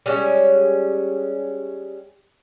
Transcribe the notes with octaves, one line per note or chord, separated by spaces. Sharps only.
G3 G#3 C#4